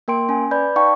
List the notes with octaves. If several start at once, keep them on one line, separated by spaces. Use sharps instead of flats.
A#3 A#4 G5 C6 D7
C#4 G#5
B4 D5 B5 G6
D#4 D5 F5 G5 A5 C#6